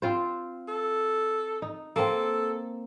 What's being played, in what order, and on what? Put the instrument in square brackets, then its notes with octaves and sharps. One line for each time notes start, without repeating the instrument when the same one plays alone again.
[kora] C4 F4 C5
[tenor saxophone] A4
[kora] D#4
[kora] A#3 C4 [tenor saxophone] A4